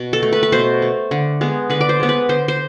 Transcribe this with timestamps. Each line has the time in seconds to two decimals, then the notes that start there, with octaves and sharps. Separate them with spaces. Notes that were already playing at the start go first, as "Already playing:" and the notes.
Already playing: B2
0.13 A4
0.23 A3
0.33 B4
0.43 B4
0.52 B2 C5
0.82 A3
1.11 D3
1.41 G#3 B3
1.70 D3 B4
1.81 D5
1.89 C5
2.00 G#3 B3
2.09 B4
2.29 D3 C5
2.48 C5